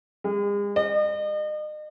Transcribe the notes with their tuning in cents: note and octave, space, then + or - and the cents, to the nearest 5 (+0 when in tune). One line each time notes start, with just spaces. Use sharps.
G#3 -40
D#5 -40